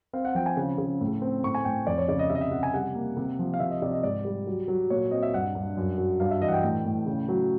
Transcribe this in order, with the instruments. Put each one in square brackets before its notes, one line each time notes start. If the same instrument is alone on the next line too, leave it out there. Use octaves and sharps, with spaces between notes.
[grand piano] C4 F5
F#5
F3 G5
G#5
C#3
C#3
A2
C4
A2 C#6
G#5
A2 G5
F2 D5
C#5
C#3 D5
D#5
C3 E5
D#5
E5
C3 F#5
G#5
G3 F#5
A#3
C3
F3
F5
C3 E5
D#5
C3 D5
D#5
G#2 D5
G3
F#3
F#3
A#2 C#5
C4 D#5
E5
G2 F#5
G2
F#2
F#3
G2 F5
E5
E3 D#5
F#5
G5
A2
A2
C#3
F#3